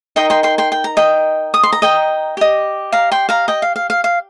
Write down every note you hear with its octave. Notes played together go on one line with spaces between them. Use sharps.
D#4 A#4 D#5 G5 C6
G5 C6
G5 C6
G5 C6
G5
A#5
D#5 G5
D#6
C6
A#5
D#5 G5
G4 D#5
F5 A#5
G5 C6
F5 A#5
D#5 G5
F5
F5
F5
F5